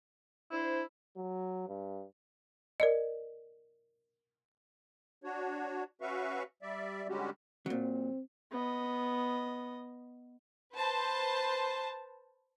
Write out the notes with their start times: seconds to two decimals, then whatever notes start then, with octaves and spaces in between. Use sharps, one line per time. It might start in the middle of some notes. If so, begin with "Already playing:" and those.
0.52 D4 E4 C5
1.17 F#3
1.68 G2
2.80 A#4 D5 D#5
5.24 D4 F#4 C#5
6.01 C#4 F#4 B4 E5 F5 C#6
6.62 G3 D5 E5
7.09 D3 G3 G#3 C#4 F#4 G4
7.66 A#2 F#3 C4
8.51 B3 D#5
10.73 B4 C5 A5